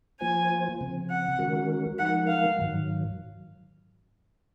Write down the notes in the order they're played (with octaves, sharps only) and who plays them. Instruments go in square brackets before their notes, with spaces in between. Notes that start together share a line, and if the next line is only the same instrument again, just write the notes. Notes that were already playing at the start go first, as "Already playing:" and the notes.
[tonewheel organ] F3 A#3 F4 C5 [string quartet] G#5
[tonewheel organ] C#3 F3 C4
[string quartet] F#5
[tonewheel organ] D#3 G#3 C#4 F#4 A#4
[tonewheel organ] F3 G#3 D#4 A#4 [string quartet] F#5
[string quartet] F5
[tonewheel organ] G#2 D#3 F#3